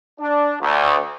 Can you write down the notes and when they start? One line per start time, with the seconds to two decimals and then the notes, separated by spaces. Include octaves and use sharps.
0.20 D4
0.61 D2